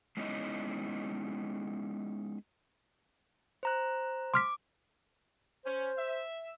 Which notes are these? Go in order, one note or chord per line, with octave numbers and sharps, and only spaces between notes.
G#3 B3 C#4 D#4 E4 D#5
C5 A#5 F#6
C6 D6 F6 B6
C#4 C5
E5